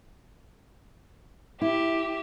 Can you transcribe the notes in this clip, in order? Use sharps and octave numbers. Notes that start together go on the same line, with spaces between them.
E4 G4 E5